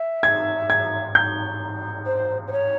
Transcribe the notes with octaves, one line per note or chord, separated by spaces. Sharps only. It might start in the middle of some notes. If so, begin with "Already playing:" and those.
Already playing: E5
G#6
G#6
G6
C5
C5
C#5